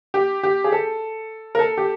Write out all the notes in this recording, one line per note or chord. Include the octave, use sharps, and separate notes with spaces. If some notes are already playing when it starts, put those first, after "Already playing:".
G4
G4
G#4
A4
A#4
A4
G4